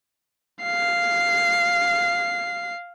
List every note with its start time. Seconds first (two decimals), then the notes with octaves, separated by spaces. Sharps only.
0.63 F5 C7